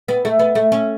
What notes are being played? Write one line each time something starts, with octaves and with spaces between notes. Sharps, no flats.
B3
A3
B3
A3
C#4